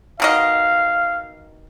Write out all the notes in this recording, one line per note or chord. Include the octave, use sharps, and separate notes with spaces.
B2 D#3 D#5 F5